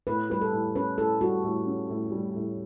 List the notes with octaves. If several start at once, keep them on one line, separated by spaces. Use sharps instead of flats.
A2 B4
G3 B4
A4
A2
C#4 B4
A2 A4
G3 F#4
A2
C#4
A2
G3
A2